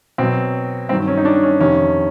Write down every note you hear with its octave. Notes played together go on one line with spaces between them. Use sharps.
B2 F#3 C4
G2 D#3 F#3 C4
C#4
D#4
D4
C#4
F2 C3 D#3 C#4